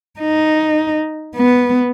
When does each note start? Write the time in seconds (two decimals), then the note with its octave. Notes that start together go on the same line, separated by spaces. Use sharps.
0.20 D#4
1.36 B3